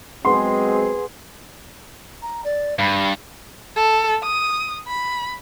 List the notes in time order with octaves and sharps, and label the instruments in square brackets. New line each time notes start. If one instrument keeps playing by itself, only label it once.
[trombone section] F#3 G#3 C4 [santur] B3 [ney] G#4 [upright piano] C6
[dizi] A#5
D5
[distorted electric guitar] G2 [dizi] B5
[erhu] A4
D#6
B5